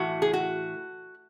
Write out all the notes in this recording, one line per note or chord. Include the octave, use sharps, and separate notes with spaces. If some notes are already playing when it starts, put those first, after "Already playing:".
Already playing: A2 E3 F#4
G#4
F#4